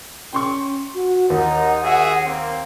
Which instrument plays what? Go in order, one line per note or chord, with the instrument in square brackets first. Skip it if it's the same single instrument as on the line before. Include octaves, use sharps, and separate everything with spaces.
[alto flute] C#4 [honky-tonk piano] G5 C6 C#6
[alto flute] F#4
[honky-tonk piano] D#2 [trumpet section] D#4 [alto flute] F#5
[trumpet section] F#4 G#4 E5
A#3 C4